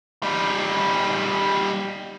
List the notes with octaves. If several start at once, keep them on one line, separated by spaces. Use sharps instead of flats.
G3 D#4